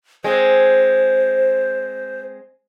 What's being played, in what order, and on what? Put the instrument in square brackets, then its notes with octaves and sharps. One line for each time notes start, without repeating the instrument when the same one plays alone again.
[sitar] G#3 C4 [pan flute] C5